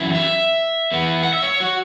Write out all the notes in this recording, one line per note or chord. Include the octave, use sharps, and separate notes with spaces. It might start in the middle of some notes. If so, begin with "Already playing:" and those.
Already playing: F#2 E3 E4
E5
E2 E3 B3
F#5
E5
C#5
F#4